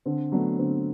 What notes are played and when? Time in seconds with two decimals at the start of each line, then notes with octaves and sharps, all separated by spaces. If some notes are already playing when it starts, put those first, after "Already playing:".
0.06 D3 C4
0.32 F#3 A3 B3 D4
0.59 D3 C4